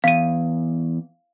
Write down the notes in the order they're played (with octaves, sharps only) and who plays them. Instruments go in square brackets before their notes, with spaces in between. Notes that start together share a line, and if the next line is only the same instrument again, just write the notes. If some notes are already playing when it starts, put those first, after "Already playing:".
[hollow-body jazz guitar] E2 [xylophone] F5 D#7